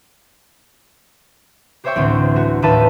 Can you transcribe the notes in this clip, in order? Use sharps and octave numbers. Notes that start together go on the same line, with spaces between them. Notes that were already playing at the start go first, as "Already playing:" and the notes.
G4 C5 C#5 E5 G5 C#6
A1 D2 C4
A3 F#4
A1 D#2 B4 E5 A5 D#7